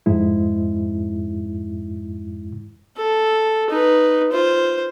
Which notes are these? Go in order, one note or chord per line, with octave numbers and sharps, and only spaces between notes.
F2 G#2 G#3 E4
A4
D#4 B4
F4 C5